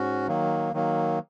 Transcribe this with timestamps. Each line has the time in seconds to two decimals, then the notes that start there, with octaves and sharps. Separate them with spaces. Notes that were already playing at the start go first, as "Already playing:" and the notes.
Already playing: G#2 C#4 F#4
0.27 D#3 F#3 A#3
0.73 D#3 F#3 A#3